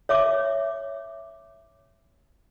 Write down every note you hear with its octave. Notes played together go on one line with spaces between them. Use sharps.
C#5 E5 D6